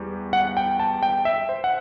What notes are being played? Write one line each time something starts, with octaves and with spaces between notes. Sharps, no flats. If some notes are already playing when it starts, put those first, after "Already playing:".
Already playing: E2 G3
F#5
G5
A5
G5
E5
C5
F#5